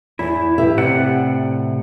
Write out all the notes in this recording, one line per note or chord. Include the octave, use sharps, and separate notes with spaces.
E2 E4
G4 B4 E5
A2 C3 D5 F#5